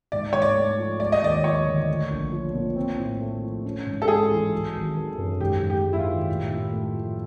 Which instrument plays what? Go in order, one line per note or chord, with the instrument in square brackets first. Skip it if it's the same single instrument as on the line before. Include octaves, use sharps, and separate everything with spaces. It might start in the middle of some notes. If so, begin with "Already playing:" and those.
[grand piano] G#2 [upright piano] D5
[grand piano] G#2 [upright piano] C#5
[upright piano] D5
[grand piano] A3
F3
[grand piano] G#3 [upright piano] D5
[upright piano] D#5
[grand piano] D#2 [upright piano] D5
[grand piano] F3 [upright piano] C#5
[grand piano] D3
A3
A#1
F3
A#2
C4
A2
A3
F3
C#4
G#2
[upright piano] A4
[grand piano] G#3 [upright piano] G#4
[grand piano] E3
F#3
G#1
D#3
F#2
[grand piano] G#2 [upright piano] G4
[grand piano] G#2
[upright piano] G4
[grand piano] G#3
[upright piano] E4
F4
[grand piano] D#3
A2
A2
A3
F3